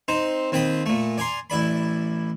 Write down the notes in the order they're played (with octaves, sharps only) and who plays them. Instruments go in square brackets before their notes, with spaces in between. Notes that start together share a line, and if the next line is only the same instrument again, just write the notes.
[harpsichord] C4 D#4 C5
D#2 C4 G5 B5 D#6
A#2 A3
D5 G#5 A#5 C6
A1 E4 D5 B5